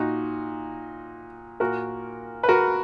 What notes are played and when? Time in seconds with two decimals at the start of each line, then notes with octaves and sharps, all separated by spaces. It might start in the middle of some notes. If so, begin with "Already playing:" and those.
Already playing: A#2 D#4 F#4
1.60 A#2 F#4 A#4
2.43 B4
2.49 F#4 A#4